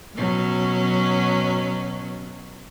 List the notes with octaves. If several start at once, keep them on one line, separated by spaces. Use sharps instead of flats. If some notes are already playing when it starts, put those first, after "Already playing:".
B2 F#3 C#4